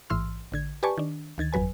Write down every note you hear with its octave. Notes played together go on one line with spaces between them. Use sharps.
A1 G#2 E3 C6 E6 F6
A1 D3 G#6
G4 B4 D5 G#5 A5 C#6
D#3 D4
D2 D#3 G#6 A6
G1 F2 F#3 B4 G#5